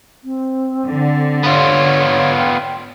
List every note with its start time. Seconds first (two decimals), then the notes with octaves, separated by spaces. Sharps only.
0.24 C4
0.87 D3
1.44 B3 F4 C#5
2.38 G5